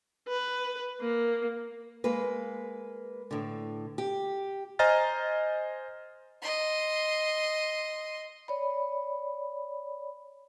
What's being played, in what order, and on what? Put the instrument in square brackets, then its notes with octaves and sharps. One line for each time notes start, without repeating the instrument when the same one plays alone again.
[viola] B4
A#3
[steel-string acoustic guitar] G#3 A#3 B4
A2 D3
G4
[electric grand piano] C5 D#5 G#5 A#5 F6 A6
[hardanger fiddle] D#5 C6
[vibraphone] C#5 D5 B5